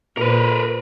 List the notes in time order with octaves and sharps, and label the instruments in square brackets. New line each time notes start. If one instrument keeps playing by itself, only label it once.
[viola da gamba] A#2 [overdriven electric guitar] A#4 B4